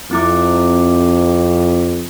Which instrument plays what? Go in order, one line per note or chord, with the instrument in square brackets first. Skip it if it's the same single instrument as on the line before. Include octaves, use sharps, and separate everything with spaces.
[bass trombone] F2 [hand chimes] C4 E4 D6